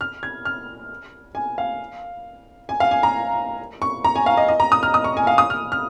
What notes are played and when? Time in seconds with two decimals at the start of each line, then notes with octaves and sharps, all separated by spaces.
0.01 F6
0.23 G#6
0.45 F6
1.35 G#5
1.58 F5
2.69 G#5
2.80 F5
2.91 G#5
3.03 A#5
3.82 C#6
4.05 A#5
4.16 G#5
4.26 F5
4.37 D#5
4.48 D#5
4.60 A#5
4.72 D#6
4.83 F6
4.94 D#6
5.04 C#6
5.17 G#5
5.27 F5
5.38 D#6
5.50 F6
5.72 F6